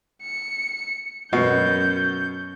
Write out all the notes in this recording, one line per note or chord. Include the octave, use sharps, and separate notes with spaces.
C#7
F#2 B2 C#4 G6